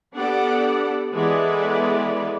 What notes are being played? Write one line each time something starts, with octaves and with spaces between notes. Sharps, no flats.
B3 D4 G4 A4 D5 F#5
E3 G#3 B3 A4 B4 D5